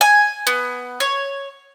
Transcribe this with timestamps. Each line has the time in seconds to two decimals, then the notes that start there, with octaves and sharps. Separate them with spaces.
0.01 G#5
0.47 B3
1.00 C#5